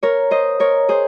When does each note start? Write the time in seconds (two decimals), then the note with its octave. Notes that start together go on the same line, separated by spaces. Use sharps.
0.03 A#4 C#5
0.31 C5 D#5
0.60 A#4 C#5
0.89 G#4 C5